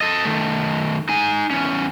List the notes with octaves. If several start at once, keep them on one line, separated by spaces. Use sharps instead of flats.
A4 D#5
D#3 A3
D#4 G#5
E2 C#4